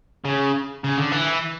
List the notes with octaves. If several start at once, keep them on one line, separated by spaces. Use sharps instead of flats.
C#3
C#3
D3
E3